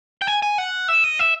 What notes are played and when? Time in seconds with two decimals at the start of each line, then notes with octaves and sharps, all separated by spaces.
0.22 G5
0.27 G#5
0.43 G#5
0.58 F#5
0.88 E5
1.04 D#5
1.19 E5